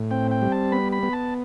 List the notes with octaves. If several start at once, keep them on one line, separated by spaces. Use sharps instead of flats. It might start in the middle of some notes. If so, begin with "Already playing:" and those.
Already playing: A2
C4 G5
G5
G3
A5
B3 B5
B5
B3
A5